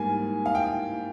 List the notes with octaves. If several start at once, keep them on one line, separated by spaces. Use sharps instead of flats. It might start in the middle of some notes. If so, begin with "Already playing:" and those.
Already playing: G#2 G3 A#3 G#5
F5
G5